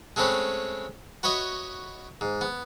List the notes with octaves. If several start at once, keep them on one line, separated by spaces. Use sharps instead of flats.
G#3 A3 C4 C#4 B4
F#4 B4 C#5 D#5 E5
G#2
B3